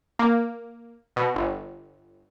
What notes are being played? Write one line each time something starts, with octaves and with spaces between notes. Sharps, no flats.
A#3
B2
G1